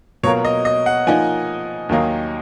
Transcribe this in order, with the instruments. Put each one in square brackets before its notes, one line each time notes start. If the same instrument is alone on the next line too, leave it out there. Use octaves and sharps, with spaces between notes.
[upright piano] B2 F#3 A#3 F4 A#4 [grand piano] C#5
[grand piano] D#5
D#5
F#5
[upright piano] F3 A#3 D#4 A#4 D#5 [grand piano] G#5
[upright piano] D#2 D#3 F#3 A#3 D#4